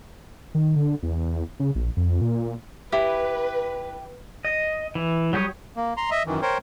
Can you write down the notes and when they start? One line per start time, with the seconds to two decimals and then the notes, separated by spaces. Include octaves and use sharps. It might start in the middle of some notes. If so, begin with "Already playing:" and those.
0.55 D#3
0.76 D3
1.03 E2
1.60 C#3
1.75 A#1
1.97 F2
2.21 A#2
2.92 E4 G4 B4
4.45 D#5
4.95 E3
5.33 F#3 G3 G4 C#5 D#6
5.77 A#3
5.97 A#5 C6
6.11 D#5 E5
6.27 F#2 D#3 E3
6.42 A#4 C5 C#5 G5